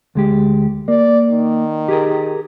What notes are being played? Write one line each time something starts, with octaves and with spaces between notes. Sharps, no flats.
D2 G#3 G4
A#3 D5
D#3
G4 G#4 A#4